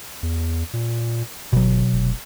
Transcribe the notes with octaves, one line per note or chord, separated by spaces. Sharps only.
E2
A#2
G1 B2 F#3
F1